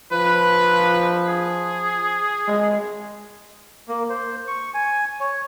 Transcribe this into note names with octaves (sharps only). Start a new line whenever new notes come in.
F3 B4
G#4
G#3
A#3
C5
C#6
G#5
C#5